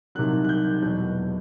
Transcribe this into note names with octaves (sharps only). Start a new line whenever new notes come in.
C2 C3 D#3 F#3 F#6
F#6
G6
E1 E2 B2 F#3 G6